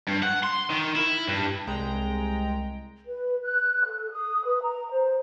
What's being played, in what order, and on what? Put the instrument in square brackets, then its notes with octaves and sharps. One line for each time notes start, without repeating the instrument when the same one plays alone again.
[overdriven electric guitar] G2
F#5
C6
D#3
E4
G2
[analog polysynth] C2 G#3 G5 A#5
[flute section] B4
F#6
A4
D#6
B4
A#5
C5